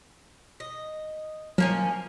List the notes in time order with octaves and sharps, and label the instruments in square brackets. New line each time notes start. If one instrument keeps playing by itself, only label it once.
[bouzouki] D#5
[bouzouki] F3 A#3 C#4 [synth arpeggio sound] F#3